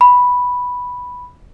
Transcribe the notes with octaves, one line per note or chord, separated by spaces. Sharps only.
B5